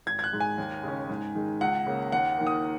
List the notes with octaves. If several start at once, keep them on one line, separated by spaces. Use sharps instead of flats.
G#1 G#6
G#6
F#6
G#2 G#3
G#5
D#2
C#3 G#3 C#4
G#2
D#3 G#3
C#2 F#5
C#3 A#3
D#2 F#5
D#3 A#3
D#6